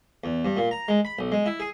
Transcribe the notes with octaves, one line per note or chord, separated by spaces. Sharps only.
E2
G2
A#2
A#5
G#3
B5
B1
G#3
E4
G#4